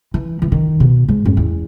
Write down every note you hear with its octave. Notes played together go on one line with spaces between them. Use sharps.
E3
E3
D#3
B2
G#2
F#2
E2